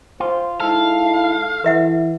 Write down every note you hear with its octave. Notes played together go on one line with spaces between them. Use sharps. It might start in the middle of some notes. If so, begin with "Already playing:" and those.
F4 C5
G#3 D#4 E4 A4 F5
E3 B4 E5 F#5